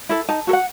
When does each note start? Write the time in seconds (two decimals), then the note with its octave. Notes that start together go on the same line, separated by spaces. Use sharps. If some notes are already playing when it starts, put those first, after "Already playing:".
0.09 E4 A4
0.29 D#4 A5
0.47 F#4 A4
0.53 F#5